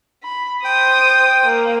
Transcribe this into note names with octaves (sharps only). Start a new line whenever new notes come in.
B5
C5 G5 D#6
A#3